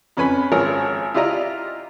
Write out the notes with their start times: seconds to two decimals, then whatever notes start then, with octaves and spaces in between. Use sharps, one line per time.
0.17 F2 C#4 B4 G#5 B5
0.52 G#1 F3 G#4 A#4 C#5
1.14 E4 F4 G4 D5 D#5 A#5